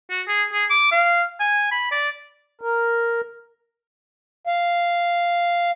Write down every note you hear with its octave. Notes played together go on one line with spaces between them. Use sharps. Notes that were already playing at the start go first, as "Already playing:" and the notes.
F#4
G#4
G#4
D6
F5
G#5
B5
D5
A#4
F5